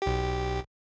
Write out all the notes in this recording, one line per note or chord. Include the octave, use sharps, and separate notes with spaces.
B1 G4